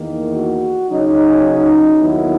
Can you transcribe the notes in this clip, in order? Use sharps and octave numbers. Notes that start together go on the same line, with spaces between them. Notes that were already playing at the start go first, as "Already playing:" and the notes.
Already playing: E2 D#3 A#3
F#4
C#3 F#3 C#4 D#4
D#2 D#3 F#3 B3 E4